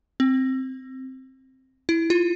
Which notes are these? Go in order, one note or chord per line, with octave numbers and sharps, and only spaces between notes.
C4
E4
F4